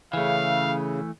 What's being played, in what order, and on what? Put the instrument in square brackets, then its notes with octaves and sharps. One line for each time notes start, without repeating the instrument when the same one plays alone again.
[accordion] C#3 [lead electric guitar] E3 A3 [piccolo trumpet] F5